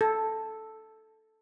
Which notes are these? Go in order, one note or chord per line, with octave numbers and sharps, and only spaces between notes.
A4